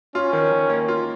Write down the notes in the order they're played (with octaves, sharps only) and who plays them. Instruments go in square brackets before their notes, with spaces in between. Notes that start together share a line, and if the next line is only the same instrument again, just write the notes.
[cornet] C#4 [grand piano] F4
[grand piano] D#3
D#3
A#3
F4